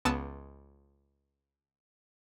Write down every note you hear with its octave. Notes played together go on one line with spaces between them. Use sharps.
C#2 B3 A5 E6